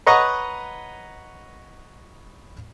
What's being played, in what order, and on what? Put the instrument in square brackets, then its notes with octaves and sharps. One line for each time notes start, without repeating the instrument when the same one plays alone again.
[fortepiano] B4 C#5 D#5 F#5 A#5 C#6